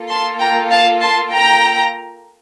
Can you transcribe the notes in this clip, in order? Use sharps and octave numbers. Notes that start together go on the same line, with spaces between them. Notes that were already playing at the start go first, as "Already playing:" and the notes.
Already playing: A#3 F4 A4
A5 C6
G5 A#5
F5 A5
A5 C6
G5 A#5